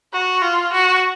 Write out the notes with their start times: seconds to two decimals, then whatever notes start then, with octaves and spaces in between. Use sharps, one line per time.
0.13 F#4
0.42 F4
0.73 F#4